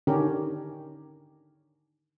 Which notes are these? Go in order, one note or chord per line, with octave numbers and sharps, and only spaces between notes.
D3 D#3 C#4 D4 G4 A#4